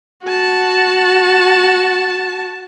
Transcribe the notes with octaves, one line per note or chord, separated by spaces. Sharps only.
F#4 A5